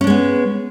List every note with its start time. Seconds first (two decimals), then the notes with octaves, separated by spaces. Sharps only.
0.01 C#4
0.04 D4
0.07 G#3
0.10 B3